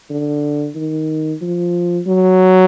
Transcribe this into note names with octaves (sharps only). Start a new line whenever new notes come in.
D3
D#3
F3
F#3